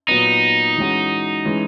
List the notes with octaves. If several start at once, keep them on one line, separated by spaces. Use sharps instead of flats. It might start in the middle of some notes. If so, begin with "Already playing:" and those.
A#2 F#3 B3 D#4
E3 G#3 C#4 F#4
E3 G#3 C#4